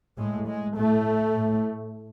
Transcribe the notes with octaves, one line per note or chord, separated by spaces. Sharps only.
A2 G#3
G#3
A2 A3
A2